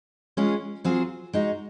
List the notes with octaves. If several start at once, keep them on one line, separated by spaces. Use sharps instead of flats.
G#3 C#4 F4 G#4
F#3 C4 F4 G#4
G#3 D#4 F#4